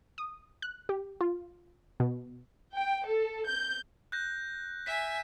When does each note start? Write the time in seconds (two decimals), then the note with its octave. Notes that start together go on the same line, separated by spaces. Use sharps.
0.18 D#6
0.62 F#6
0.89 G4
1.21 F4
2.00 B2
2.74 G5
3.06 A4
3.46 G6
4.12 F#6 G6 A#6
4.86 E5 G#5 B6